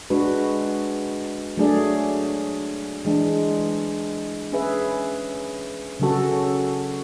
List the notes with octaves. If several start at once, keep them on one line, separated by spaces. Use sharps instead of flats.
G#3 D4 F#4 B4
F#3 A3 D4 G#4 D5
E3 G#3 D4
C#4 G#4 B4 E5
C#3 F#3 C#4 F#4 A4